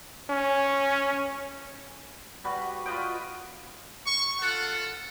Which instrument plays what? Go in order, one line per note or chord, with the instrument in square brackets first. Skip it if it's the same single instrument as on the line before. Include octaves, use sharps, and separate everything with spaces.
[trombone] C#4
[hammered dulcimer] G3 F#4 B4
F4 B4 D#5 G5
[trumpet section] C#6
F4 A4 F#5